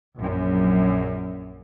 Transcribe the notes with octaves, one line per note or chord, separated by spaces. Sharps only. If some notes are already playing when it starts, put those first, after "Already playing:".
A#1 F#2